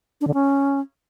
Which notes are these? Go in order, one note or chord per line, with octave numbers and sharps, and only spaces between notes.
D4
D3
C#4